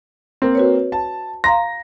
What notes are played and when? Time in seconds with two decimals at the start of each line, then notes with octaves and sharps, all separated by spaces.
0.42 A#3 C4
0.55 F#4 B4 C#5
0.92 A5
1.44 F5 A#5 C6 A#6